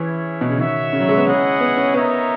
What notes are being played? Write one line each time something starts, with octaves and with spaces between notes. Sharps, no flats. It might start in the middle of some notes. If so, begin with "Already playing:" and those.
Already playing: E3 C#4 E4 G#4 C#5
B2
C#3
D#3 F#4 C#5 E5
C#3
F#3
G#3
B3
C#4 E4 G#4 D#5 F#5
B3
C#4
B3 D#4 A#4 C#5 E5